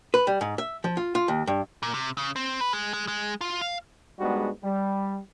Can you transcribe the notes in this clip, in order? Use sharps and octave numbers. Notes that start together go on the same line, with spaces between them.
B4
G3
G#2
E5
F3
F4
F4
D#2
G2
A#2
C3
C#3
C4
B4
G#3
G#3
G#3
F4
F5
G#2 G3 G#3 B3 D4 F#4
G3